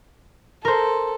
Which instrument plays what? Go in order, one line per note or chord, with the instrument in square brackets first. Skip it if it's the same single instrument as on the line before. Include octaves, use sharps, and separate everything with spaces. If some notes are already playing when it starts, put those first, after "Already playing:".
[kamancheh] A4 [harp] A#4 C5